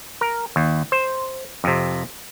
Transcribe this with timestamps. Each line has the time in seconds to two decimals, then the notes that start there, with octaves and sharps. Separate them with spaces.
0.21 A#4
0.56 D#2
0.92 C5
1.64 F2 C3